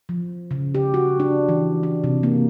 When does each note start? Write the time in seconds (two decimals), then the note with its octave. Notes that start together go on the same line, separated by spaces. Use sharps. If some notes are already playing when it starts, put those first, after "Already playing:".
0.09 F3
0.51 C#3
0.75 G4
0.94 F#4
1.20 D4
1.49 E3
1.83 D4
2.04 C3
2.23 A#3